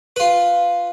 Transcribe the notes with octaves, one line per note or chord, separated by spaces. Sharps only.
F4 B4